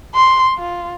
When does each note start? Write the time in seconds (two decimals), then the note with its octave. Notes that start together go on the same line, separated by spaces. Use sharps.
0.15 C6
0.59 F4